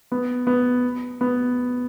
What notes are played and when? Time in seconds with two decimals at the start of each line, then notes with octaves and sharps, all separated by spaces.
0.12 B3
0.47 B3
1.21 B3